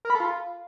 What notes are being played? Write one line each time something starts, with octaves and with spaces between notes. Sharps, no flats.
A#4
B5
A4
F4